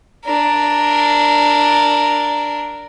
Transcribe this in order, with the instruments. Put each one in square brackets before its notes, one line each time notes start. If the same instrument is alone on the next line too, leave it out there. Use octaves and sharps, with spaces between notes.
[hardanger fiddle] D4 A#4